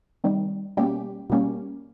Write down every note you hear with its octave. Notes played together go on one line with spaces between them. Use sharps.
C3 D#3 G3
B2 G3 A#3 C#4 G4
B2 G3 A#3 C#4